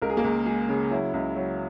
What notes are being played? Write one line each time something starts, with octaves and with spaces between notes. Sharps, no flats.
C#2 A#4
G#4
A#3 A#4
C#2
G#3 G#4
C#3
F#3 E4
C#2
F#3